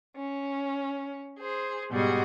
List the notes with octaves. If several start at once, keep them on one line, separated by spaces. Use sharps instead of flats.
C#4
G#4 C5
G#2 B2 G3 F#4 G#4